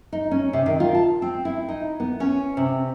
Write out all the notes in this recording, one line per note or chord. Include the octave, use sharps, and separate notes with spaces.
D#4
C#4
C3
D#3
F4
A5
C4
E4
D#4
B3
C#4
C3